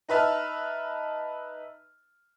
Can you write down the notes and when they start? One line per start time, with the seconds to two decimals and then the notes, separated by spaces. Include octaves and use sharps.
0.09 D#4 B4 E5 A5 F6